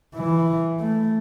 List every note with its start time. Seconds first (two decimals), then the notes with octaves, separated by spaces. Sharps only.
0.15 E3
0.80 A3